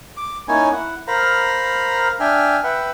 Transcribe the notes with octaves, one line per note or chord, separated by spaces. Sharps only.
D6
A#3 C#4 D#4 E4 C#5 G#5
E4 F#5
A#4 C5 F5 A#5 B5
D4 E5 G5 G#5 F6
B4 E5 F#5 G5